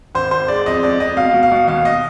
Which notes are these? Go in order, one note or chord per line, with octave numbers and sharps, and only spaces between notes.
G#1 C5
G#1 C5
G#3 D5
F2 D#5
F2 D5
F2 D#5
B2 F5
B2
F5
B2
D#2 F5
D#5